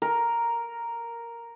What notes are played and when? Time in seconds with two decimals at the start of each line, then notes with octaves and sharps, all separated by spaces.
0.02 A#4